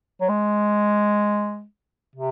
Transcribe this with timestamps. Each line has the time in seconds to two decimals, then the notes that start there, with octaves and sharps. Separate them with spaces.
0.21 F#3
0.29 G#3
2.16 C3